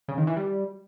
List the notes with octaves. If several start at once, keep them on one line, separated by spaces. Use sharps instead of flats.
C#3
D#3
E3
G3